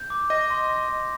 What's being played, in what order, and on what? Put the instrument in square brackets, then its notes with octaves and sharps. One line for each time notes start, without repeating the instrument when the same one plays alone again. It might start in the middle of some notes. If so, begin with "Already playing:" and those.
Already playing: [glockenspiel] G6
D6
[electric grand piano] D#5 [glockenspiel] A#6
[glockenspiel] C6